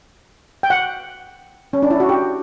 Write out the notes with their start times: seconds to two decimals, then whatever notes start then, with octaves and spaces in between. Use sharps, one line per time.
0.63 G5
0.70 F#5
1.73 C#4
1.82 D4
1.90 E4
2.00 F#4
2.09 G4